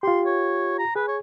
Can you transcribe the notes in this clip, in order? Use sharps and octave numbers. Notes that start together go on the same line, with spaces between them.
F4 G4 C6
C#5
A#5
G#4 B4
C#5